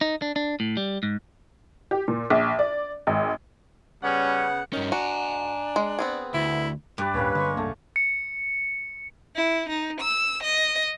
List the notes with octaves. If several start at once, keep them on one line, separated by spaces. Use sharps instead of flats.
D#4
D4
D4
A2
G3
G#2
G4
A#2
A#1
D5
G#1
C#3 G3 B3 C#4 F#5
G2 D#3 C#4
D4 F#4 G#5 A#5
G#3
B3 C4 G#4
D2 E4
G2 G3 B4 D5
D2 A2 A#3 C#4 B4
D3 G#3 C#6
E1 C2 D3 A3 A#3
C#7
E4
D#4
E6
D#5